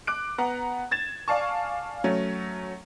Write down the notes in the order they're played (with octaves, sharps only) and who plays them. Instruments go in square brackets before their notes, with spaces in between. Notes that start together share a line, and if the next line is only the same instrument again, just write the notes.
[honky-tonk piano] D6 F#6 D7
B3 F#5 A#5
G#6 A6 E7
D5 F5 G#5 A5 C#6
F#3 A3 C#4